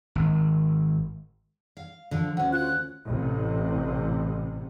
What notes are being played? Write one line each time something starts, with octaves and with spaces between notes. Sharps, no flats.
G#1
F5
D3 F3
D2 C#4 F#5
F4 F#6
A1 C3